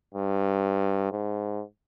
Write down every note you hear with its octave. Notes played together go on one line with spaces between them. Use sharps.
G2
G#2